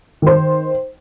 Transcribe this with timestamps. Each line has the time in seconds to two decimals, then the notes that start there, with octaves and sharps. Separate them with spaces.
0.22 D#3 C5